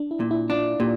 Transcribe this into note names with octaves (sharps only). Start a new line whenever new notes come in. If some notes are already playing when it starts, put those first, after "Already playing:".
Already playing: D4
E4
A#2
E4
D4 F4
A#2 G4